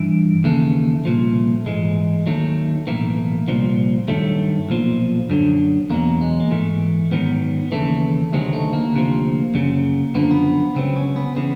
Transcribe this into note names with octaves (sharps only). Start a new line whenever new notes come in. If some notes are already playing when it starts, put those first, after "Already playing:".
Already playing: G2 E3
D#2 C#3 E3 A3
C2 A#2 F3
G#2 E3 G#3
D#2 D#3 F#3 A3
B1 A2 E3 A#3
C2 A#2 F3
G2 D#3 F#3 A3
B1 A#2 F3
F#2 D3 F#3
E2 B2 F#3 A#3
G#3
A#3
G#2 E3 A3
G#2 D#3 F#3 B3
D#2 C#3 E3 A3
D2 C3 D#3 F#3 G#3
A3
A#3
D2 C3 F3
F#2 C#3 F#3
F#2 D3 F3 B3
A#3
B3
C#2 C#3 F#3 C4
C#4
B3
C#3 E3 B3